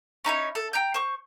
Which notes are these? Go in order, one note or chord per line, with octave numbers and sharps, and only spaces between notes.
C#4 D#4 E4 C#5
A4
G5 A#5 G6
C5 C#6